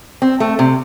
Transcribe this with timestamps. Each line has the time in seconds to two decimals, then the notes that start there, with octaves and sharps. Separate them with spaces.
0.22 C4
0.40 A3
0.59 C3